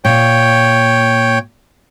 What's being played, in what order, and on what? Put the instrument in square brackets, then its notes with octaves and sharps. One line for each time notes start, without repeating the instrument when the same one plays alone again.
[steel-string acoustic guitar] A#2 [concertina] C#5 G5